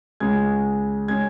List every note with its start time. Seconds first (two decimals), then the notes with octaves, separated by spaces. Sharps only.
0.20 C#2 C#3 G#3 C#4 G#6
1.08 G#3 C#4 G#6